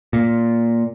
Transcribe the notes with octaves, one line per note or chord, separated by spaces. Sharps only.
A#2